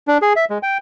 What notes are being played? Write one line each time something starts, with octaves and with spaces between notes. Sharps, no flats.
D4
G#4
E5
G#3
G5